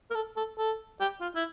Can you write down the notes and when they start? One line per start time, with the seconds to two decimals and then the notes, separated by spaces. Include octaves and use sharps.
0.10 A#4
0.15 A4
0.37 A4
0.58 A4
1.00 G4
1.21 F4
1.35 E4